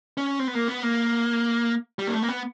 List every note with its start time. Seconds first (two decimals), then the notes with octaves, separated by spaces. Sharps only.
0.17 C#4
0.39 C4
0.48 B3
0.55 A#3
0.68 B3
0.83 A#3
1.99 G3
2.07 A#3
2.14 A3
2.22 A#3
2.28 B3